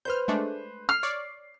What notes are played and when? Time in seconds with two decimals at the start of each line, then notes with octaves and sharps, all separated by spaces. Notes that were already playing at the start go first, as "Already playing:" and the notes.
0.05 B4 C5 F6 G6
0.28 G#3 A3 D4
0.89 F6 C7
1.03 C#5 D5